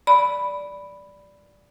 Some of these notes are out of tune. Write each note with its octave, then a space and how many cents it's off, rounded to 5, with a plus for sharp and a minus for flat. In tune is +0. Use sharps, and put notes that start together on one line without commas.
D5 -5 B5 +0